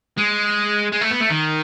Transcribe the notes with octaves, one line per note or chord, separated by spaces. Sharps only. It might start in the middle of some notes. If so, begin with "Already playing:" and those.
G#3
G#3
A3
B3
A3
D#3